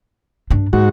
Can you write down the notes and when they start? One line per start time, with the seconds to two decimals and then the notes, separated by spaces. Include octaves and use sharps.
0.51 G2 D4
0.73 G#2 A#3 F#4